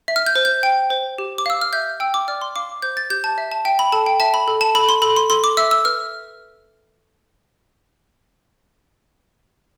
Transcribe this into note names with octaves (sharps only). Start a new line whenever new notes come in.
E5
F6
G6
C5
G6
G5
C5
G4
D6
F5 E6
F6
E5 G6
G5 E6
D6
D5 F6
C6
F5 D6
C5 G6
A6
G4 G6
A5
E5
A5
E5 G5
B5
A4 A5
G5
E5 A5
B5
A4
A5
A4 B5
C6
A4 B5
C6
A4 C6
D6
E5 E6
E6
B4 F6